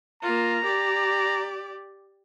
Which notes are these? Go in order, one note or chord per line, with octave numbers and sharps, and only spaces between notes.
A#3 F4 A#5
G4 D5